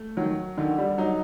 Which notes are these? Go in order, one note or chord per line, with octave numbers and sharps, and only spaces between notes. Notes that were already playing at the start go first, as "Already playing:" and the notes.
Already playing: A3
D#3 F#3
D3 D#3
G3
F#3 D#4